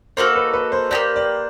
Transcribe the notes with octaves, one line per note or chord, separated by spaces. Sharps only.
A#3 D#4 F#4 A4 C5
B4
B4
C5
A#3 D#4 G4 D5
D5